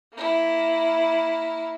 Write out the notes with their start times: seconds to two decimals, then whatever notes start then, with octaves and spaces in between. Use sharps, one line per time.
0.13 A#3 E4